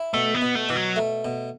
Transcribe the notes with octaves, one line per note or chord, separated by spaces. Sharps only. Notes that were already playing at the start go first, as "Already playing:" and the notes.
Already playing: E4
B2 A3
B3
B2
A3
B2 E3
F#3
A3
B2